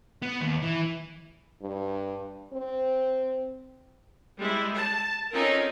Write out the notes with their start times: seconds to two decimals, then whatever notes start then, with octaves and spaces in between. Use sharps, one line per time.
0.22 B3
0.41 D#2
0.62 E3
1.62 G2
2.53 C4
4.38 G3 G#3 E4
4.75 A5
5.31 C4 C#4 D#4 F4 A4 A#4